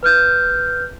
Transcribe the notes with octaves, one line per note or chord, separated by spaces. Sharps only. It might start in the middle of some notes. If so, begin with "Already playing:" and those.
B4 F6 G6